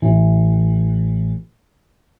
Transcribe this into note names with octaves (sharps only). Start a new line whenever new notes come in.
A1 E3